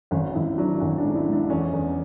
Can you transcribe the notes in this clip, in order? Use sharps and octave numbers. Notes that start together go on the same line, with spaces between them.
G#1 C#4
G#1 E4
F#3 D4
G#1 C#4
D4
G#2
E4
G#2
D4
E2 C#4
E2